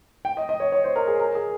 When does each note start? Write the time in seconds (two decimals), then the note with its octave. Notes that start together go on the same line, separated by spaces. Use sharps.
0.25 G5
0.37 D#5
0.49 D#5
0.60 C#5
0.72 C#5
0.84 C5
0.96 A#4
1.07 G#4
1.20 A#4
1.35 G#4